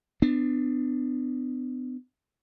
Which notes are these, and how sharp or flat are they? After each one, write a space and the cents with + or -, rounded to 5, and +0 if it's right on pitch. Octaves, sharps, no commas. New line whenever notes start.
B3 +40 D4 +30